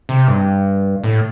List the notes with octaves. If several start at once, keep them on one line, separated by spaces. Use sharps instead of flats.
C3
G2
A2